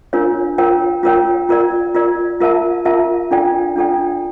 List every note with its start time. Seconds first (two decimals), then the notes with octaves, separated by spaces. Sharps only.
0.13 D4 F4 A#4 C#5
0.58 F4 A#4 C#5 G5
1.03 F4 A#4 C#5 G5
1.49 F4 A#4 D5
1.95 F4 A#4 D5
2.40 F4 A#4 E5 A5
2.85 F4 A#4 E5 A5
3.31 D4 F4 A4 D5 G5
3.76 D4 F4 A4 D5 G5